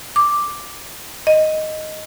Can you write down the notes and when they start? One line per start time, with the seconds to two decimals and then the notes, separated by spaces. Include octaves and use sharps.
0.16 D6
1.27 D#5